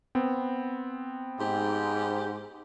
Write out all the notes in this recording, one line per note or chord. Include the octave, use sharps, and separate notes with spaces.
B3 C4
G#2 G4